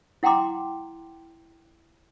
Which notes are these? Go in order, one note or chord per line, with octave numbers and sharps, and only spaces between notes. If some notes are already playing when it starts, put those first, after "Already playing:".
E4 F#5 G5 A#5 C6 D6